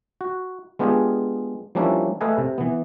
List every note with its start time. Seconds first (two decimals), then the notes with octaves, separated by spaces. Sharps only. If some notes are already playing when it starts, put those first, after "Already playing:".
0.21 F#4
0.79 G#3 B3 D4 F4 G4 G#4
1.75 F3 G3 A#3 C#4 D4 E4
2.21 A3 A4 B4 D#5 F5 G#5
2.38 C3
2.58 E3 B3